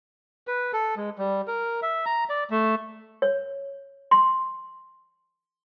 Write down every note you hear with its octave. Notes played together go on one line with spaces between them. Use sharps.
B4
A4
G#3
G3
A#4
E5
A#5
D5
A3
C#5
C6